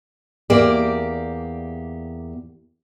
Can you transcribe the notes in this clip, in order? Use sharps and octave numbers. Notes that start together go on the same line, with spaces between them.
E2 A#3 G4 D5